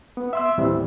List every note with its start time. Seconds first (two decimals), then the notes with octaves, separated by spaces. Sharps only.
0.17 B3
0.33 E5 C6 E6
0.58 D#2 A2 E3 G3 C4